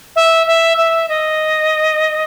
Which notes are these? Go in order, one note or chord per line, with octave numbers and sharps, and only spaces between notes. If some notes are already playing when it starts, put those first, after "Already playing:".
E5
E5
E5
D#5